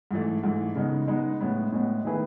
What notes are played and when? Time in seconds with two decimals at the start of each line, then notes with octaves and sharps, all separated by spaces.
0.11 G#2 E3 A3
0.43 G#2 E3 A3
0.75 C#3 G#3 B3 D#4
1.07 C#3 G#3 B3 D#4
1.40 A2 G#3 B3
1.72 A2 G#3 B3
2.05 D#3 A3 E4 G#4 B4